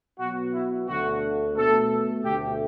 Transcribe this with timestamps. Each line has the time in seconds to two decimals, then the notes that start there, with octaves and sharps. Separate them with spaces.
0.20 B2 F#3 B3 F#4
0.54 E4
0.89 D2 D3 A3 F#4
1.56 B2 A3 A4
2.25 D2 D3 A3 G4